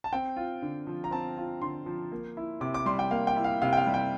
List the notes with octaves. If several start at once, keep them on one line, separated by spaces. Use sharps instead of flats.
A5
C4 G5
F4
D3
F3
A#5
C4 A5
F4
D3 C6
F3
A#3
E4
C3 D6
D6
G3 C6
G5
A#3 F5
G5
E4
F5
C3 F5
G5
F5
G3
G5